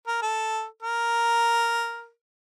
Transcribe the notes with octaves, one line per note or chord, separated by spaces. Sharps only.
A#4
A4
A#4